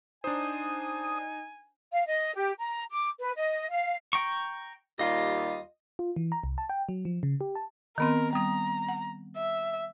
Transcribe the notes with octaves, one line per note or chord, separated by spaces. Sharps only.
D4 D#4 C5 G#5 D#6
F5
D#5
G4
A#5
D6
B4
D#5
F5
G5 A#5 C#6
D#2 G3 F4 D#5
F4
E3
A#5
C2
A5
G5
F#3
F3
C#3
G4
A5
D#3 B3 C4 A#4
G3 A#5 D#6
F#5
E5